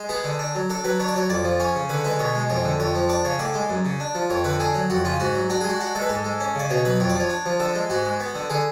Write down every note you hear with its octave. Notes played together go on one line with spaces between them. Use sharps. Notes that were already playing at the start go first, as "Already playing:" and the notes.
Already playing: G#3
B3 G#4
D3
D4
F#3
D4 A4
F#3 B4
D4 C#5
D5
F#3 C#5
F2 D5
F3
C#4 C#5
C#3
D3 B4
G#3 B4
B2 C#5
G#3
F2 C#5
D3
F2 C#5
F3
D4 D5
C#3 C#5
A2 D5
G#3
F#2
C#3
D4
F3
F2 C#5
D3 B4
D4 G#4
F#3
F2 F#4
C#3 F4
G#2 F#4
F#3
D4 F#4
G#4
G#3
F#4
D4 F#4
G#3 A4
B4
G#2 A4
G#3
C#4
C#3 D5
B2 C#5
F#3 B4
F2 C#5
D5
F3
C#5
D4
F3
D3 A4
G#3
G#2 F#4
G#3
B3
D3
D3 G#4